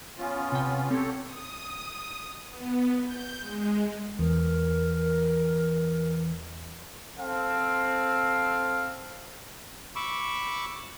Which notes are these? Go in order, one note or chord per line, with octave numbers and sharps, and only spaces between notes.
B3 C#4 F4
C3 G5
C4 G4 A4 C#5
D#6
B3
G6
G#3
E2 E3 A#4
C4 A4 F5
B5 C#6 D6 E6